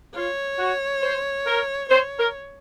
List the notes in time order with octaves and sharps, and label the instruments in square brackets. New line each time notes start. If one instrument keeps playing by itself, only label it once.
[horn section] F4 [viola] C#5
[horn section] F#4
C5
A#4
[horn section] C5 [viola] C#5
[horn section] A#4